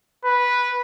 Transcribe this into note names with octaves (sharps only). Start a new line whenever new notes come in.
B4